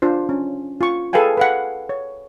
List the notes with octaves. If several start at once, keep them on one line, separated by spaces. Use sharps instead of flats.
D4 F4 C5
C#4
F4 C#6
G#4 A4 B4 F5 G5 G#5
B4 F5 F#5
C#5